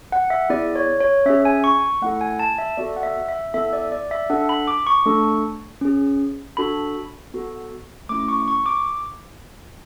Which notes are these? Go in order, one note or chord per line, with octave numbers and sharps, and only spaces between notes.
F#5
E5
B3 E4 G#4 D5
C#5
C#5
C#4 G#4 E5
G#5
C#6
A3 E4 A4 F#5
G#5
A5
E5
B3 F#4 A4 D5
F#5
E5
E5
B3 E4 A4 E5
D5
D5
E5
D4 A4 F#5
B5
D6
C#6
A3 D4 A4
C#4 G#4
D4 F#4 A4 B5
B3 F#4 A4
A3 C#4 E4 D6
C#6
C#6
D6